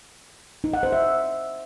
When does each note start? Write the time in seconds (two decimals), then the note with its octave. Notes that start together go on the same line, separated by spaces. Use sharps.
0.64 D#4
0.73 F#5
0.83 C5
0.93 E5